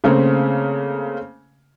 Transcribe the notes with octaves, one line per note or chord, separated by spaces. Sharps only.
C#3 A3 A#3 C4 C#4